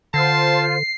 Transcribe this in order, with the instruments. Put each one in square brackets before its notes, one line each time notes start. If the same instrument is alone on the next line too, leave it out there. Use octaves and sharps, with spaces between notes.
[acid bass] D3 [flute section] F4 C5 [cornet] A5 [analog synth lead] C7